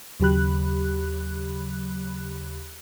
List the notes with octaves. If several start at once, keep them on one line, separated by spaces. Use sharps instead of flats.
D#2 C#3 F#3 G4 B5 F#6